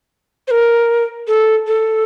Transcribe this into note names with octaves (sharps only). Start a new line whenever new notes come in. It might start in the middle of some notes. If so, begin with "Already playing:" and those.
C5
A#4
A4
A4